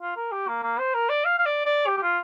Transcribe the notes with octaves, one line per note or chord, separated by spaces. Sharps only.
F4
A#4
G4
A#3
A#3
C5
A#4
D5
F5
F5
D5
D5
G4
G4
F4